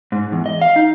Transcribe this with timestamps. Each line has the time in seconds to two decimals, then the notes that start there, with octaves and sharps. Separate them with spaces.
0.12 G#2
0.32 E2
0.46 D#5
0.62 F5
0.76 D#4